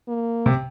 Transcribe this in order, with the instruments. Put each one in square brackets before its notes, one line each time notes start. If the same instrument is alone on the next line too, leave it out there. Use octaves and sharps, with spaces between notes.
[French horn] A#3
[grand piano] C3